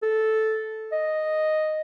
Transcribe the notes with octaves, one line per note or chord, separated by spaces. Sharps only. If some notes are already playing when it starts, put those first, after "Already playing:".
A4
D#5